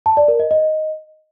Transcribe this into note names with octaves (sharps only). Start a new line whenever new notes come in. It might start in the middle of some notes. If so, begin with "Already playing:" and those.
A5
D5
A#4
D#5
D#5